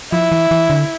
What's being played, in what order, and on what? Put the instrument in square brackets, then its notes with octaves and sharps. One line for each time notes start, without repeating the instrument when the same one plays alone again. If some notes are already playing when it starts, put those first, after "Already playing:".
[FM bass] F3 [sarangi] E4
[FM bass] E3
E3
D3